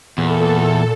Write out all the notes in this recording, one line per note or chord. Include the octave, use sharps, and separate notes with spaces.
E2 A#2 A4